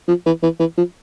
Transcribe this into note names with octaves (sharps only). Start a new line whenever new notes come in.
F3
E3
E3
E3
F3